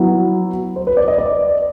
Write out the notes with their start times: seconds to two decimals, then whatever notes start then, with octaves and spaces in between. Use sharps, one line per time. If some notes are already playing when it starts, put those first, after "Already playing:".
Already playing: F#3 B3 E4
0.76 C5
0.87 B4
0.97 D5
1.08 D#5
1.18 D5